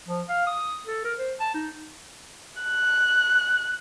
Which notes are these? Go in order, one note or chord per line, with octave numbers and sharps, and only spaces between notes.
F3
F5
D#6
A4
A#4
C5
A5
D#4
F#6